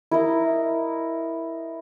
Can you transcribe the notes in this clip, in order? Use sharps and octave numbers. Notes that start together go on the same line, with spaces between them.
E4 A#4 D#5